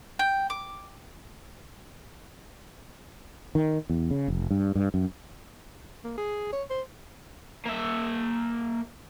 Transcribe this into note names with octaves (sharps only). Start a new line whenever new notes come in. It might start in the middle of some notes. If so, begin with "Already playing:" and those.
G5
D6
D#3
E2
C#3
F1
G2
G2
F#2
A#3
G#4
C#5
C5
A#3 E5